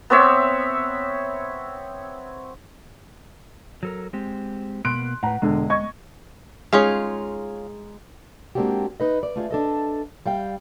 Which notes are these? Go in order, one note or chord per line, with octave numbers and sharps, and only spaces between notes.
B3 C4 C#5 E5
F#3 A4 A#4
G#3 C4 G4
B2 A#3 B3 C6 F#6 D7
A2 B4 F#5 A#5
E1 D3 G#3
D#5 C#6 G#6
G#3 C#4 D#4 F4 G#4 F5
G#3 A#3 C4 D4 F#4 G4
D#4 B4 D#5
D5
A3 F4 G4 G#4
D4 A4 D#5
G3 F5 G5